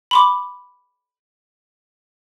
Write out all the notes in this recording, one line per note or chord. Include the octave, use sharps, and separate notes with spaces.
B5 C6 D6